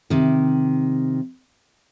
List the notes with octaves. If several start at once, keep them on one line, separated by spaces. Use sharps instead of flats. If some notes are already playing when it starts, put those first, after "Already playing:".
C3 D#3